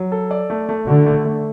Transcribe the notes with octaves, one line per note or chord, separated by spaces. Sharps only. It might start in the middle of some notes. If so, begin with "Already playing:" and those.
Already playing: F#3
A4
D5
A3
A3
D3 F#4
A3
A3